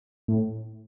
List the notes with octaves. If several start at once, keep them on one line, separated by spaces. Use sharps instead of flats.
A2